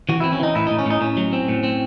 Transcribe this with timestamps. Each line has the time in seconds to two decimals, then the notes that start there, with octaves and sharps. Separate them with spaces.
0.09 E3 F#4
0.20 C4 E4
0.33 C#4
0.40 E3 D#4
0.55 A2 E4
0.67 A2 D#4
0.79 C#4
0.86 A2 D#4
1.01 A2 C#4
1.17 F#3
1.33 C4
1.48 A2
1.63 C4